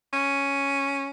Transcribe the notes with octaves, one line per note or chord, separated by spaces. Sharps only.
C#4